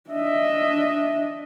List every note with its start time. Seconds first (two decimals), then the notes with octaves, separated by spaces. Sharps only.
0.10 D4 D#5 E5